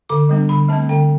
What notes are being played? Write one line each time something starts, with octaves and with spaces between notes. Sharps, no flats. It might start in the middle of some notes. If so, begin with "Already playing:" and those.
D3 D6
G3 B3 D4
D3 B5
A3 C4 A5
D3 G5